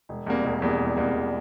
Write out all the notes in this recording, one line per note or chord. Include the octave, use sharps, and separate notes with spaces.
E1
E2 C3 G3 A#3
E1
E2 C3 G3 A#3
E1
E2 C3 G3 A#3
E1